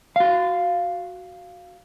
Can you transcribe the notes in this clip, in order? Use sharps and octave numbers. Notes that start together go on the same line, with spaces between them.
F#4 F5